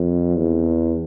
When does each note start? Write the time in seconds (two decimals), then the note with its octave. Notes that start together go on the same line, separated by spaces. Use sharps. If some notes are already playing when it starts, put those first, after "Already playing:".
Already playing: F2
0.36 E2